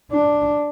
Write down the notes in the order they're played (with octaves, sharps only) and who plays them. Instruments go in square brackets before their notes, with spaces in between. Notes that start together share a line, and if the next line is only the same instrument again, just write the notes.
[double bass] D4